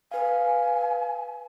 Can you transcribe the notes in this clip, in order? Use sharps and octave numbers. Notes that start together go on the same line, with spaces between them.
B4 F5 G#5